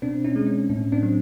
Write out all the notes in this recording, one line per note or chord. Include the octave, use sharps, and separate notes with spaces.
B2 C4 D4
C#4 D#4
G#3
C#4
A2 C#4
C4 D4
F#3